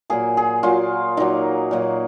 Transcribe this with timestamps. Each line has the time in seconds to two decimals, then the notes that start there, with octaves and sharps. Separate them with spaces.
0.10 A#2 F#3 A#3 G#4
0.37 G#4
0.63 A#2 F#3 A#3 F4
1.17 A#2 F#3 A#3 D#4
1.71 A#2 F#3 A#3